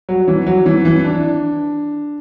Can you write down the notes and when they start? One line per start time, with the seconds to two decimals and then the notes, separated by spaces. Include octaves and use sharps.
0.09 F#3
0.28 E3
0.47 F#3
0.66 E3
0.85 E3
1.05 D4